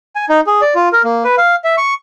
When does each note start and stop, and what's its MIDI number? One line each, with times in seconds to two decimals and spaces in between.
0.16 0.25 80
0.29 0.41 63
0.47 0.61 68
0.62 0.74 74
0.75 0.89 65
0.93 1.02 70
1.04 1.24 58
1.24 1.35 71
1.38 1.55 77
1.64 1.76 76
1.77 1.94 85